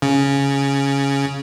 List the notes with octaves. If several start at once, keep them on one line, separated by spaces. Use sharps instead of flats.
C#3